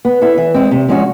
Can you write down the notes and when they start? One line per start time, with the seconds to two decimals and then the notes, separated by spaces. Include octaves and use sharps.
0.05 B3
0.21 E4 A4
0.38 E3
0.54 G#3 C4
0.71 C3
0.88 F3 G#3 C#4 F#4